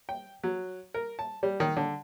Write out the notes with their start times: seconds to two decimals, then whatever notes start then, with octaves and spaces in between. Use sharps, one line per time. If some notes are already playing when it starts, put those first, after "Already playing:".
0.09 G5
0.43 F#3
0.94 A#4
1.19 A5
1.43 G3
1.60 D#3
1.77 D3